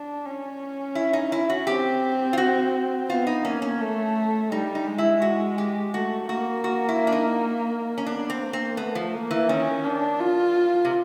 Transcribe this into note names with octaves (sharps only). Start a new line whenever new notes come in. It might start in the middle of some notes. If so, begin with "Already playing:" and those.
Already playing: D4
C#4
E4
D#4
E4
F#4
C4 G4
F4
F#4
B3 F4
D#4
A#3 C#4
C#4
A3
G3 D#4
D#4
G#3
E4
F#4
G4
A3 F#4
A#3 F#4
F#4
E4
D4
D#4
C#4
B3 D4
C4
A#3
C4
A3 B3
F3
A#3
E3
D#3 C#4
D4
F4
C3